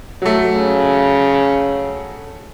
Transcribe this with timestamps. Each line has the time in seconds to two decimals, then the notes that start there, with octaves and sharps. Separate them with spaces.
0.22 F#3 A3
0.55 C#3